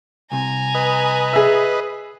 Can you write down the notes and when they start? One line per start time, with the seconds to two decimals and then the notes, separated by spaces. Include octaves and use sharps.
0.32 C2 C3 G#5 A#5
0.75 B4 D#5
1.33 G#4 E5